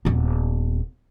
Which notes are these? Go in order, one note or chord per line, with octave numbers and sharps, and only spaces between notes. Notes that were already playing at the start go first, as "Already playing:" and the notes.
D#1 B3